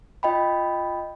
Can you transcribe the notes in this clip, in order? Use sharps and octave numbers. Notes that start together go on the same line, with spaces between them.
F4 D#5 G5 B5